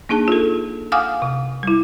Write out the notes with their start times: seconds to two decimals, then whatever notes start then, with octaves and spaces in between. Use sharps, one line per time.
0.09 A#3 D4 D#4 G#4 A5
0.28 F4 A4
0.92 F5 F#5 G#5 D6 D#6 F6
1.22 C3
1.63 G3 E4